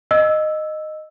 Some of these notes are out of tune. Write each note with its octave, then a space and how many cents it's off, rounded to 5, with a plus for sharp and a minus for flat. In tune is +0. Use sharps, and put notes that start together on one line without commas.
D#5 -10 E6 +0